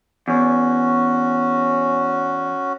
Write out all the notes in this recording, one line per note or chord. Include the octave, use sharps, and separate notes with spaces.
E2 C#4 F#4